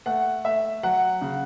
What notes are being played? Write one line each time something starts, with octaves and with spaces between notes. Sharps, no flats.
A3 F#5
A3 E5
F#3 F#5
C#3